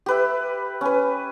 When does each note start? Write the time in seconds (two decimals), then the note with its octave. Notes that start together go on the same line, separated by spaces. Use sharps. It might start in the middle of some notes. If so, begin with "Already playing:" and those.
0.06 G4 B4 E5
0.81 C#4 B4